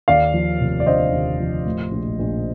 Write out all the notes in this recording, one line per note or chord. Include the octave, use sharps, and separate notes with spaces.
D#2 D5 F5
F3
F1
D5
D3 C5 D#5
D#2
F3
A2
A#1
A#1